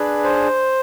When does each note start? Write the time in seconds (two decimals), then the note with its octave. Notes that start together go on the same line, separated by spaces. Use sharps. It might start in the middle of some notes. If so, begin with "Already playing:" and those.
Already playing: D4 G#4 B4
0.24 C5